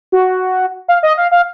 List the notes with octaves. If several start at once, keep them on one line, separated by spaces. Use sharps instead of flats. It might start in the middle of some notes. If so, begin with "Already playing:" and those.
F#4
F5
D#5
F5
F5